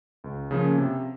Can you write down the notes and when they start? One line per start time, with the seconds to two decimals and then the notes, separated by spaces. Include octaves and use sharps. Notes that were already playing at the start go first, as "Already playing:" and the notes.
0.24 C#2
0.51 C#3 F3 A#3 C#4
0.78 C3